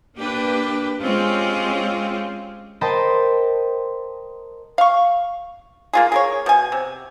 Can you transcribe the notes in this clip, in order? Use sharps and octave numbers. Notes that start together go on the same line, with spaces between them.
A#3 D4 G4 B4
G#3 C4 C#4 F4 G4
A#4 C5 D#5 G5 A5 B5
F5 C#6
A#3 F4 G#4
G#4 A#4 C#5
B2 G#5
C3